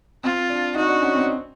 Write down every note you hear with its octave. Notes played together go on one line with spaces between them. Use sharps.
C4 F4
D4
D#4 F#4
D4
C#4
C4